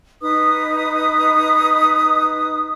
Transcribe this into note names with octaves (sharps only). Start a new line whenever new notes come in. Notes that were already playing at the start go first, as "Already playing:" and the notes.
D#4 B4 D#6